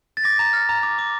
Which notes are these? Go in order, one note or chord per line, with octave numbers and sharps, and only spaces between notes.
A6
D6 A#6
A#5
F6
A#5
D6
D6